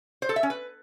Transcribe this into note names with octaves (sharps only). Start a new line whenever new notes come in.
C5
A4
E5
C#4
B4